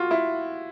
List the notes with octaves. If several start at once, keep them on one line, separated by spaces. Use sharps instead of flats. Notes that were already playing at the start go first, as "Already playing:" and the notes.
Already playing: F4 F#4
E4